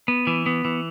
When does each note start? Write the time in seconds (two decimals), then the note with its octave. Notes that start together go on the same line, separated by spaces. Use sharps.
0.08 B3
0.27 E3
0.46 B3
0.65 E3